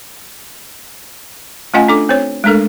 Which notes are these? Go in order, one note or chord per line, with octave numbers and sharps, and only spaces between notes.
A3 C#4 F4 D#5 F#5 G#5
D4 A4 D6
C4 C5 C#5
G#3 A3 D4 A4 A#4